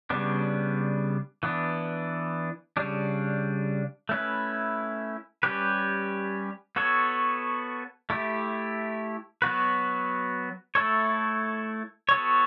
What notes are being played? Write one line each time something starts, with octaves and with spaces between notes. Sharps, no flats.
C#3 G3 B3 D4
E3 B3 D4
C#3 G3 D4
A3 C#4 E4 B4
G3 C#4 G4 B4
B3 F#4 A4 C#5
A3 E4 G4
F#3 B3 F#4 B4
A3 E4 A4 C#5
B3 F#4 A4 C#5